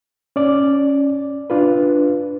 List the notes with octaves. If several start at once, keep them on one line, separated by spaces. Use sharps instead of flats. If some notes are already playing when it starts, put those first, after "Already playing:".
C#4 D5
D4 F4 B4